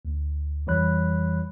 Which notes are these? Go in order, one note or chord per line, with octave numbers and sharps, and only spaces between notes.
D2
F2 E3 G3 C#5 B5 F#6